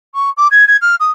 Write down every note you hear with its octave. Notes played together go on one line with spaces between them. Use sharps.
C#6
D6
G#6
G#6
F6
D#6